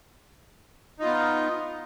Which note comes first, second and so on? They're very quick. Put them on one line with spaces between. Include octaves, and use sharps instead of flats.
D#4 F4 B3